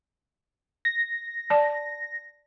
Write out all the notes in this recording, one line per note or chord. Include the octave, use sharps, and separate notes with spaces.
A#6
D5 A5